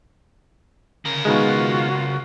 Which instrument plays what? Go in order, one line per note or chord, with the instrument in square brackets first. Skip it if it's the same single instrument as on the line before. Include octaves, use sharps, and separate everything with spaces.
[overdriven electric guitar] C#3 A#4
[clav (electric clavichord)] B2 D#3 G#3 [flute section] F4 F#4